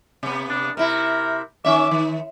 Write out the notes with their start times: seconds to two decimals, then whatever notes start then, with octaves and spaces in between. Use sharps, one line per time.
0.23 C3 B3
0.49 D4
0.77 C3 E4 A#4
1.65 D#3 C#4 E5 D6
1.91 D#3